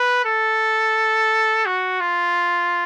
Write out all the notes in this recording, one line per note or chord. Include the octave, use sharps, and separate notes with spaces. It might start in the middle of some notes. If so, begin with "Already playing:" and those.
Already playing: B4
A4
F#4
F4